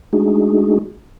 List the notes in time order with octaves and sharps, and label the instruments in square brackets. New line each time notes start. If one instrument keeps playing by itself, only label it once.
[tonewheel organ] G#3 A3 D4 D#4 F#4 G#4